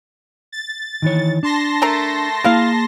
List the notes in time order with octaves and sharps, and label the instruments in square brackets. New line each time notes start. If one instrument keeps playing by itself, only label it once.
[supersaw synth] A6
[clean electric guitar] D#3 E3 C#5
[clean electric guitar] D4 [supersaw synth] A5 C6 A#6
[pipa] A3 A#4 A#5
[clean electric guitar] A#3 G#4 [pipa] E4 F5